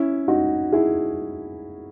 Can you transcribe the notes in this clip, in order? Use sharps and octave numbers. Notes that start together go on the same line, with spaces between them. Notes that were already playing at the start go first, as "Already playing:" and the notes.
Already playing: C#4 E4
D#4 F#4
E4 G#4